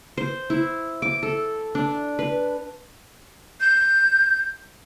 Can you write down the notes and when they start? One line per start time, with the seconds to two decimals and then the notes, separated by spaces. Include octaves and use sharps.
0.18 C5
0.50 E4
1.02 D6
1.23 A4
1.75 D4
2.19 B4
3.60 G6